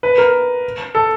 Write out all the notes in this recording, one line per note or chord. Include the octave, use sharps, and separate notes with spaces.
B4
A#4
A4